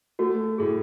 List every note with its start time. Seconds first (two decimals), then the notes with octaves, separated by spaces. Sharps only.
0.19 A3 F#4
0.58 A2 G#4